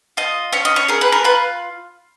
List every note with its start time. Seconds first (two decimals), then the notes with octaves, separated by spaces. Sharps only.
0.17 F4 D#5
0.53 C#4 C#5
0.65 D#5
0.76 C#5
0.88 G#4 A#4
1.01 B4
1.12 A#4
1.24 F4 B4